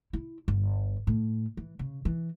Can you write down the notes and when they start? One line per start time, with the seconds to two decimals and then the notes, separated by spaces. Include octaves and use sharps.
0.13 E4
0.48 G1
1.07 A2
1.57 E3
1.79 C#3
2.05 E3